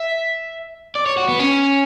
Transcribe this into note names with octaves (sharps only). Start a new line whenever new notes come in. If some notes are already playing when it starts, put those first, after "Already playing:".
Already playing: E5
D5
C#5
F#4
B3
C#4